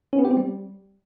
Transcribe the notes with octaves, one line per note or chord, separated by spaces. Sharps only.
C#4
B3
G4
C4
G3